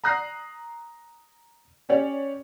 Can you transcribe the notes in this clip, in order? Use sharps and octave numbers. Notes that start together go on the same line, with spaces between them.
A#5 D#6 F#6 A#6 C7
C#4 G4 C#5 D5